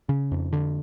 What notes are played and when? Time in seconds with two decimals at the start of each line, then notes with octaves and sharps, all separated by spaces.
0.09 C#3
0.31 F2
0.53 D3